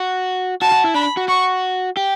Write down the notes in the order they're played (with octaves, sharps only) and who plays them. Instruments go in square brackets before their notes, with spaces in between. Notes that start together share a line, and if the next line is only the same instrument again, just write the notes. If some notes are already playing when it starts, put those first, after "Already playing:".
Already playing: [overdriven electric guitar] F#4
[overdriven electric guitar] F#4 [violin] A5
[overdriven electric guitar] F#4
E4
[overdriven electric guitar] D4 [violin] B5
[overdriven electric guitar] F#4
[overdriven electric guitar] F#4 [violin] C#6
[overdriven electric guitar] G4